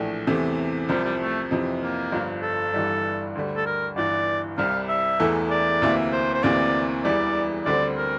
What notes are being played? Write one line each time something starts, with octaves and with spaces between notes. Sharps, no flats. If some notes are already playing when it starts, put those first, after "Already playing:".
Already playing: A#1 A2 E3 A3 D4
E2 C3 E3 A3
C2 C3 F3 G3
G3
A3
F2 C3 E3
A#3
G1 G2 F3
A4
G1 G2 E3 G3
D2 D3 G3
A4
A#4
G1 G2 E3 D5
C2 C3 G3 F5
E5
E1 E2 E3 A3
D5
D2 C3 E3 A#3 E4
C5
C5
D2 C3 E3 A#3 D5
E1 E2 E3 G3 D5
D2 D3 G3 C4 D5
A#4